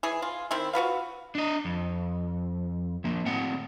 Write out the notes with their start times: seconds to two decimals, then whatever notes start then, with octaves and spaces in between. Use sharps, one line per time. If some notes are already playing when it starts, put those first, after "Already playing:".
0.03 E3 G#4
0.22 F4
0.51 D#3 C4 E4
0.73 F4 F#4 B4 F5
1.35 D4 D#5
1.65 F2
3.04 F3 A#3
3.26 A2 C4 F#5